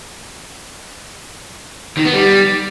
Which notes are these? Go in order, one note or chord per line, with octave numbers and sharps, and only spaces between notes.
D#3
B3
G3